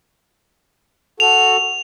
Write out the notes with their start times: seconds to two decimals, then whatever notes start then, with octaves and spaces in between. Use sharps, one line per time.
1.20 F#4 A4 F7